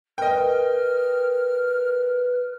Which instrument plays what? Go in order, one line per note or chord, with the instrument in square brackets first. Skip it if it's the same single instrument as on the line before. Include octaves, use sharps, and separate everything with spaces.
[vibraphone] A#4 [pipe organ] B4 [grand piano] D#5 G5 [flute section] F6